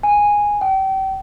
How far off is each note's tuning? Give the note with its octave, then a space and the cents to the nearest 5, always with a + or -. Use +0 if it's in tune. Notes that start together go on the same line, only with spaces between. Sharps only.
G#5 -10
G5 -35